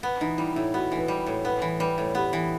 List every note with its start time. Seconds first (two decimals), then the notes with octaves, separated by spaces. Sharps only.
0.03 B3 B4
0.21 E3 D#4
0.38 G3 E4
0.56 A2 E4
0.73 B3 F#4
0.92 E3
0.97 B4
1.08 G3
1.26 A2
1.45 B3 B4
1.62 E3
1.79 G3 B4
1.98 A2
2.15 B3 G4
2.33 E3